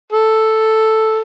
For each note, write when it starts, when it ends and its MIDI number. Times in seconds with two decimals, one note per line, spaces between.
0.13 1.20 69